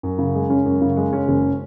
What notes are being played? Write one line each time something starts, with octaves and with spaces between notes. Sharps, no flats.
F#2
C#3
G#3
C#4
F#2
C#3
G#3
C#4
F#1